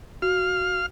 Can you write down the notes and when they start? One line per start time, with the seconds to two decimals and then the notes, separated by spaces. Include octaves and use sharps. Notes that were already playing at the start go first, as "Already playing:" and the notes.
0.22 F#4 F5 F6